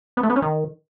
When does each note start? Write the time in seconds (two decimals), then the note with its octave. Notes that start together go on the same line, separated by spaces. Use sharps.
0.17 B3
0.23 A3
0.30 B3
0.36 C#4
0.42 D#3